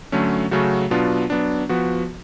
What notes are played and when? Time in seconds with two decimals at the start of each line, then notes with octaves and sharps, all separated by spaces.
0.12 D3 F#3 A3 C#4
0.51 C#3 F#3 A3 C#4 F#4
0.90 B2 F#3 B3 D4 F4
1.30 F#3 B3 D4
1.69 F3 B3 F#4